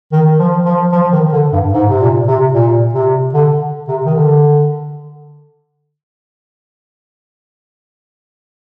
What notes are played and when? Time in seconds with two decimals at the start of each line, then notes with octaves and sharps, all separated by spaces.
0.12 D#3
0.39 F3
0.65 F3
0.92 F3
1.13 D#3
1.33 D3
1.53 G2
1.73 G#2
1.89 C3
2.00 A#2
2.28 C3
2.53 A#2
2.94 C3
3.34 D3
3.88 C3
4.06 D#3
4.14 D3